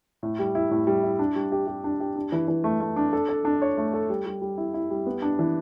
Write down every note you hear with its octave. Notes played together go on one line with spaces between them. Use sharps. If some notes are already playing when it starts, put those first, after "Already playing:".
A2
G3
E4
A2
G3
E4
D4
G3
G4
G4
D4
G4
D4
E3
E3
A3
A3
D4
A4
A4
D4
C#5
A3
A4
G3
G3
G3
E4
E4
G3
B3
D4
E3